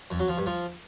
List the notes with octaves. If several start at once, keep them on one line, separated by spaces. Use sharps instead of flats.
F2
F#3
F3
G2
F3